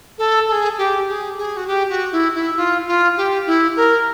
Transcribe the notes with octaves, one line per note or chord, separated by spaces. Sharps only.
A4
A4
G#4
G4
G#4
G#4
F#4
G4
F#4
E4
E4
F4
F4
G4
E4
A#4